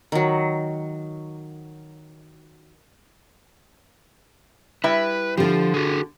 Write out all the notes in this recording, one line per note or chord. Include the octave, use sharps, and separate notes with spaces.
D#3 F#3
G3 E4 B4 E5
D3 F3 G4
F#4 G#4